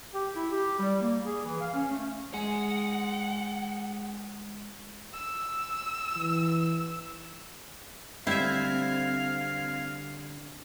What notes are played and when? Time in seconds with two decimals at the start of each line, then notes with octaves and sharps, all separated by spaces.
0.14 G4
0.36 E4
0.52 G4
0.79 G3
1.02 A#3
1.25 G#4
1.45 E3
1.61 F5
1.74 C#4
1.91 A3
2.34 G#3 G#4 F#5
5.13 E6
6.16 E3
8.27 D2 D3 G3 C4 E4 E5 F5 G#6